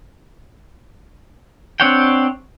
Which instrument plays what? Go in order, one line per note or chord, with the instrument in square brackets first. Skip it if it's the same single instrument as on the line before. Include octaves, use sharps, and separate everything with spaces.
[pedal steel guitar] C4 D4 C#5 F#5 G5